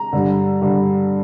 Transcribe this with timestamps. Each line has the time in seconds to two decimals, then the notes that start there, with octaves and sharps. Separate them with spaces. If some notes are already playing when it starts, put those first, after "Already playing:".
Already playing: A#5
0.13 G2 D3
0.62 G2 D3